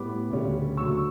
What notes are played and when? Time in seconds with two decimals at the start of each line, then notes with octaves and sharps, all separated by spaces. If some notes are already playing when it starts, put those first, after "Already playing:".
Already playing: A2 G3 B3 B5 D6
0.30 D2 C#3 G3 C#4
0.77 D2 D3 F#3 C#6 E6